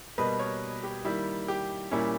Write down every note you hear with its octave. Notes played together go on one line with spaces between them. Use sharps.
B2 G3 A#3 B4 D#5
A#4 C#5
G4
D#3 G3 A#3 E4
G4
A#2 G3 A#3 C#4 E4